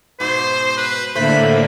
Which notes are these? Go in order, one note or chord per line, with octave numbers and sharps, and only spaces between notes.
G#2 B2 C5
B4
A2 D3 A3 A#3 C5 B5